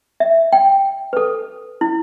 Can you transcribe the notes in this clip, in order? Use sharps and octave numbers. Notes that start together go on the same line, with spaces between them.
E5
G5
B4
A4
E4